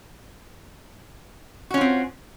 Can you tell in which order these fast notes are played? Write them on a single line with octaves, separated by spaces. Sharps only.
F#4 C#4 F4 C4